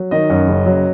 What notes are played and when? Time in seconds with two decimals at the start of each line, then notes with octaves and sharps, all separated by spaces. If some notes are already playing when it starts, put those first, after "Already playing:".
Already playing: F#3
0.11 D#3 D#5
0.30 F#2
0.48 F#1
0.66 F#3